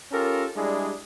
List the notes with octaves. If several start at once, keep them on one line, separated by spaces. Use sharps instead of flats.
C#4 F4 G4 A4 A#4
G3 G#3 D4 E4 G#4